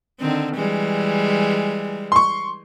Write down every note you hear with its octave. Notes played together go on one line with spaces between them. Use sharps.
D3 D#3 C4
E3 G3 G#3
C6 C#6